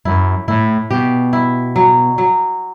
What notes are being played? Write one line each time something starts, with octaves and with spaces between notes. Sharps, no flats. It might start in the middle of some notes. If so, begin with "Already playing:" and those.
F#2 E4
A2 E4
B2 G4
E4
F#3
F#3